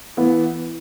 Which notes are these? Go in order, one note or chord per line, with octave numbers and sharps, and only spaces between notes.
E3 B3 E4